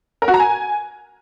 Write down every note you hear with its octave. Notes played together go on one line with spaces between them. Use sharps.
A#4
F#4
A#5
G#5